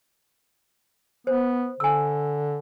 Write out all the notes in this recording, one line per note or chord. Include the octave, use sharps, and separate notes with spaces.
B3 C5
D3 G#5 E6